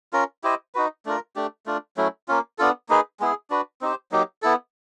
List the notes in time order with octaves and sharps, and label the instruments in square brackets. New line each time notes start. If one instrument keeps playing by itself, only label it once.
[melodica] C#4 F4 A#4
E4 G4 C5 D#5
D#4 F#4 B4
A3 D4 F4 A#4
A3 D4 G4
A3 D4 F4
F#3 A3 C#4 E4
A#3 C#4 F4
B3 D4 F4 A4
A#3 D#4 G#4 B4
G#3 B3 E4 G#4
D4 F#4 B4
C4 D#4 G4 C5
F#3 A#3 D#4 G4
B3 E4 A4